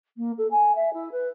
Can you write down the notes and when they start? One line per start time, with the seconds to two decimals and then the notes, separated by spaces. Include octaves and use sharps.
0.17 A#3
0.38 A4
0.50 G#5
0.75 E5
0.93 E4
1.11 B4